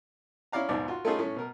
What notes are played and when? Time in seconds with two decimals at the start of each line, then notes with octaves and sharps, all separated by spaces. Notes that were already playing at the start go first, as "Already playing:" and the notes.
0.52 C#4 E4 D5 F5 A#5
0.69 G#1 D#2 G#2 B2 D5
0.88 F4 F#4
1.05 A3 C#4 D#4 F4 G#4 A4
1.19 A2 A3 C#4
1.36 B2 A#4